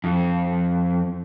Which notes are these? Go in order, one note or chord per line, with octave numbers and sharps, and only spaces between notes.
F2